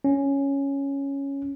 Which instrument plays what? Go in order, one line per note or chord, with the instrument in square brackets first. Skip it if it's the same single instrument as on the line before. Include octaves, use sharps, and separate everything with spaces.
[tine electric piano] C#4